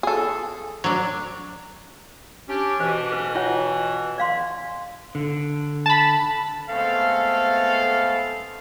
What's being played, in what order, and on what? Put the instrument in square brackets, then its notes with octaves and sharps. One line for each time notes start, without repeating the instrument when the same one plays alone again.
[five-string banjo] G#4 A4
[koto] F#3 D4
[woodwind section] C#4 D4 G4
[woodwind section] B2 E3 [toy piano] C5
[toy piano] B4
F4 C#5 F#5
D5 F5 C6
[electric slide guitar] D3
[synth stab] A5 B5
[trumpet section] G#3 A3 B3 C4 A4 F5